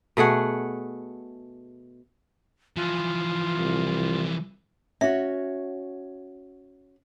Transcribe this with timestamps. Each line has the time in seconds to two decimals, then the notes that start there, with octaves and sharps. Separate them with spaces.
0.17 B2 A3 G#4 F#5
2.76 E3 F3 F4
3.58 C2
5.01 C#4 F#4 E5